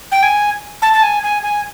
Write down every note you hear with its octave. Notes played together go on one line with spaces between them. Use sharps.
G5
G#5
A5
A5
G#5
G#5
G#5